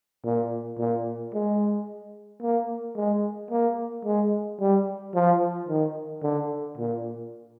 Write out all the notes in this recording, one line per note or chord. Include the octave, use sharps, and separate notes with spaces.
A#2
A#2
G#3
A#3
G#3
A#3
G#3
G3
F3
D#3
D3
A#2